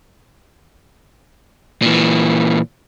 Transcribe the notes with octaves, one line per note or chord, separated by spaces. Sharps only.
A#2 E3